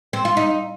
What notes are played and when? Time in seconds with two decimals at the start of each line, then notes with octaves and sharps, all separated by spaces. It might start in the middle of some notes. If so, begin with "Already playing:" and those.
0.13 C4
0.25 F4
0.37 D#4